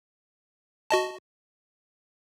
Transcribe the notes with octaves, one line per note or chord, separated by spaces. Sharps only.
F#4 D#5 A5